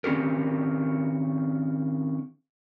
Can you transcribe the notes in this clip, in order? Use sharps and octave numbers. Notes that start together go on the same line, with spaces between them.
D#3 C4 C#4 G4 A#4